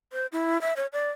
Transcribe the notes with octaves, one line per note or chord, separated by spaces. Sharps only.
C5
E4
E5
C#5
D5